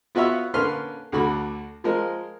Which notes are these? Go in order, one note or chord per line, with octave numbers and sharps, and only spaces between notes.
B3 F4 F#4 B4 C#5 E5
D3 A#3 C#4 B4 C6 F6
D2 D3 F#4 B5
F3 G#3 A#4 C5